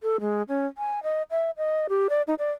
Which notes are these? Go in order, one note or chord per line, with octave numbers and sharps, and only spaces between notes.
A4
G#3
C#4
G#5
D#5
E5
D#5
G4
D5
D#4
D5